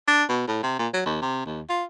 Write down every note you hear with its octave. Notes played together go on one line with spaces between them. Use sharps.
D4
B2
A2
C3
A#2
F#3
D#2
C3
D#2
F4